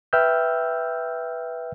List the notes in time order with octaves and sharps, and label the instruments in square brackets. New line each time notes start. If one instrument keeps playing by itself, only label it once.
[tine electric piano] B4 E5 G5 E6 F6 G6